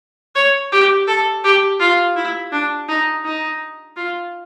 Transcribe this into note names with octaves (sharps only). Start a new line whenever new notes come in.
C#5
G4
A4
G4
F4
E4
D4
D#4
D#4
F4